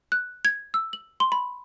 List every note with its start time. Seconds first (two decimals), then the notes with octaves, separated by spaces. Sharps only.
0.12 F#6
0.45 G#6
0.74 E6
0.93 F#7
1.20 C6
1.32 B5